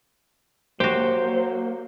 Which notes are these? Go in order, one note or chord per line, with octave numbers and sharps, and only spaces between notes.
F#3 A#3 F#4 G4 C5